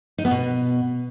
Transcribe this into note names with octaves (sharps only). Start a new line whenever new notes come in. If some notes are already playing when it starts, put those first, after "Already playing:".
D#4
B3
B2